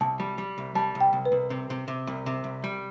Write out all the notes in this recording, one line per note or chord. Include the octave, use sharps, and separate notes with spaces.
C2 A5
G3
G3
C2
G3 A5
C2
G5
C2
B4
C2
C3
C3
C3
C2
C3
C2
G3